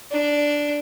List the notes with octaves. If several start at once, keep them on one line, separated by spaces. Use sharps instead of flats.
D4